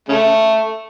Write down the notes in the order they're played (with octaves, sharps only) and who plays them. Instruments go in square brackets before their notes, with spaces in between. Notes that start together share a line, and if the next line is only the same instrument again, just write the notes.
[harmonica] C#3 A3